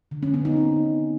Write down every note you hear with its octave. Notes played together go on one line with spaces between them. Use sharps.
D3
C#4
B3
D#4
C4